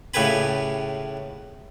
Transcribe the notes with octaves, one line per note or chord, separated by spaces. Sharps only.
A2 C#3 G4 B4 G#5 B5